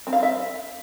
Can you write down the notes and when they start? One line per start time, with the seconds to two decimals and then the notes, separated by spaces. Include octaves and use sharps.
0.07 C4
0.13 F5
0.23 E5